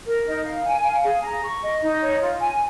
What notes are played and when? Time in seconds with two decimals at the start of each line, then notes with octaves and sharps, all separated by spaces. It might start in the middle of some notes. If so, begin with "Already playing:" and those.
0.06 A#4
0.25 D#4
0.44 F5
0.64 G#5
0.84 F5
1.03 G#4
1.23 A#5
1.42 C#6
1.62 D#5
1.82 D#4
2.01 C#5
2.21 F4
2.40 G#5